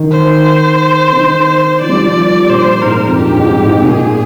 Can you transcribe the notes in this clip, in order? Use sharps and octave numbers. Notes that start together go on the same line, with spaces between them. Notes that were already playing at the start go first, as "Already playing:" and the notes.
Already playing: D#3
C5
D#3
F3 D5
G3
F3
F3
A#2 C5
G#2 A#4
F2
G2 G4
G#2
G#2
C3
A#2 G#4